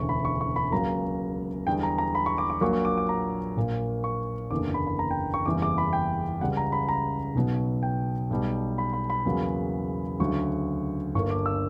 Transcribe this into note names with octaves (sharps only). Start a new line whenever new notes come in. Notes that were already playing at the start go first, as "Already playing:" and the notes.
Already playing: E1 D2 C#3 E3 C#6
B5
C#6
C#6
B5
C#2 C#3 F#3 A#3 A#5
E2 D3 G3 G5
A#5
A#5
B5
C#6
D6
D6
A#1 A#2 F#3 A#3 C#6
C#6
D6
D6
A#5
A#1 A#2 A#3
C#6
F#1 E2 D3 A#3 D6
B5
B5
A#5
G5
C#6
F#1 E2 C#3 E3 G3 D6
D6
B5
G5
C#2 C#3 G3 F#5
A#5
B5
A#5
B1 B2 F#3
G5
B1 B2 G3
B5
B5
B5
E2 C#3 F#3 A#3
D2 C#3 F#3 C#6
G1 G2 D3 A#3 C#6
D6
E6